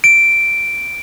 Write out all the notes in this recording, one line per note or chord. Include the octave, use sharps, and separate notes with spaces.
D7